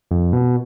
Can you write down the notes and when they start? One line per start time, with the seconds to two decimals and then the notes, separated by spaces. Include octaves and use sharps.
0.11 F2
0.33 B2